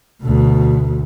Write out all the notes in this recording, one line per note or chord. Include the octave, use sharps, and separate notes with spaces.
D2 B2